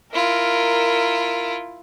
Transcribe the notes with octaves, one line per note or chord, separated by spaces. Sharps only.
E4 F4 A#4